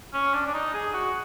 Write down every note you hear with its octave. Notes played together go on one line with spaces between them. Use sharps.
C#4
D4
D4
D#4
G#4
F#4